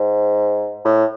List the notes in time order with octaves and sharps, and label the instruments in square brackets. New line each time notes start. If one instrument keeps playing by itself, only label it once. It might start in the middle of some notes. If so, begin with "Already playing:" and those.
Already playing: [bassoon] G#2
A2